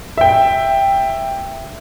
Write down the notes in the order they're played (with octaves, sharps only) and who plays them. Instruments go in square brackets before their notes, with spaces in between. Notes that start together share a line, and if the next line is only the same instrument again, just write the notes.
[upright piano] E5 G5